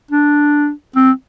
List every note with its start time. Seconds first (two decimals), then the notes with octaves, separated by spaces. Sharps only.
0.11 D4
0.96 C4